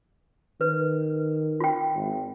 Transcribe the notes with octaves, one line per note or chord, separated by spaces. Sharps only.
D#3 B4
F4 G5
G#1